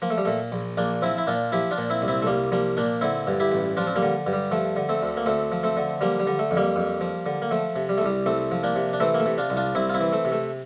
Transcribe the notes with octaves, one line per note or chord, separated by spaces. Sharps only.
F3 A#3
A3
G3
A#2 A3
A#1
A#1 A#3 D4
F3 C4 E4
E4
A#2 D4 F4
F3 E4 G4
D4 F4
A#2
C4 E4
C2
C4 E4
A3
C2 G3 A#3
F3 G3 A#3
A#2 A#3 D4
D3 C4 E4
G2
E4 G4
A1
F3 D4 F4
C4
G3 A#3
D3
G2
G3
F3 A3
D3
A3 C4
D2
A#3
D2 A3 C4
F3
A3 C4
D3
F3 G3 A#3
G3
D3
A3
F2
G3 A#3
F2
F3
D3
A#3
F3 A3
C3
G3
A3
C2 G3
C2 A3 C4
F3
A#3 D4
C3
D4
E3 A3 C4
A#3
A3
C3
D4 F4
C2
D4 F4
C2 C4 E4
F4
C4 E4
E3
A3 C4
C3
A3